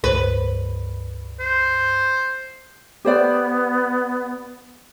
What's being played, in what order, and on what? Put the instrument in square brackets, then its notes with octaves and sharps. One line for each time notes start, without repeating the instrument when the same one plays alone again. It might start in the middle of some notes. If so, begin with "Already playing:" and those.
[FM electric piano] C#2 G2 [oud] B4
[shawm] C5
[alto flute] B3 [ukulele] G4 C5 D5